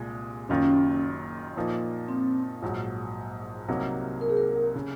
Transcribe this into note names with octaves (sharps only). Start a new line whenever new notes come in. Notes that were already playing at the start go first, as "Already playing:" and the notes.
Already playing: C2 A#2 G#3
F#1 F#2 D#3 A#3 C#4 F4
A#2 F3 A#3 D#4
C4
A#1 G#2 F#3
C2 C3 F#3 A#3 D#4
A#4
G#4
A#4
C#3